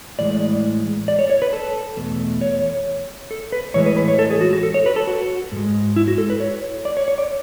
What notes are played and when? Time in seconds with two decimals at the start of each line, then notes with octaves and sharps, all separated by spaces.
0.19 A2 E3 G#3 D5
1.08 D5
1.19 C#5
1.30 C#5
1.42 B4
1.53 A4
1.97 E2 B2 A3
2.41 C#5
3.31 A4
3.52 B4
3.74 A2 E3 G#3 C#5
3.86 B4
3.97 B4
4.08 C#5
4.19 A4
4.31 G#4
4.41 F#4
4.53 F#4
4.63 A4
4.74 C#5
4.86 B4
4.96 A4
5.07 F#4
5.52 G#2 G#3
5.96 E4
6.08 F#4
6.18 A4
6.30 B4
6.40 C#5
6.85 D5
6.97 C#5
7.08 C#5
7.18 D5